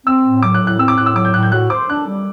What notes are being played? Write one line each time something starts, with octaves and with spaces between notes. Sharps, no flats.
C4 E6
A2
F#3 D6
F#6
A2
F#6
C4 E6
D6
A2 F#6
E6
F#3 D6
G6
A2 F#6
G6
F#4 F#6
C5 D6
D4 F#6
G3